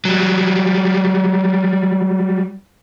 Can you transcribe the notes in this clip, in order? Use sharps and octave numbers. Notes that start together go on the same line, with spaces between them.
F#3 G3